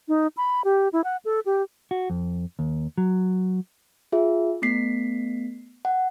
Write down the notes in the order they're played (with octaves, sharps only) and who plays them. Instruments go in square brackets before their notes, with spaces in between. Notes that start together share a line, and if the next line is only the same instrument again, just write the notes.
[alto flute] D#4
B5
G4
E4
F#5
A4
G4
[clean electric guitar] F#4
F2
D#2
F#3
[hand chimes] F4 G#4 E5
A3 B3 B6 C7
F#5